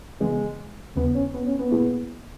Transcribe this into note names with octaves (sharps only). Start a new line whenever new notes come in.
C#3 E3 G#3 B3
D#2 C#3 E3 B3
C#4
B3
C#4
B3
A#2 A#3 E4 G#4